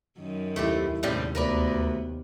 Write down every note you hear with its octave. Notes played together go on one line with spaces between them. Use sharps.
F#2 D#3
D#2 A3 C4 E4 G4
D#2 A2 C3 G3 G#3 C4 C#4
D2 B3 A#4 B4 D5